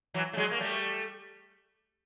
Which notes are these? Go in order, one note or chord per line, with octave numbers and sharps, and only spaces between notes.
E3 F#3
A3
F#3 G#3
A#3
G3 A3